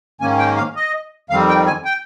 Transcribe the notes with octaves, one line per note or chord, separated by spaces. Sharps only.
G#2 D#3 A#3 C#4 G#5
G5
F5
D#5
F2 D#3 G3 C4 F5
G5
G#5
G5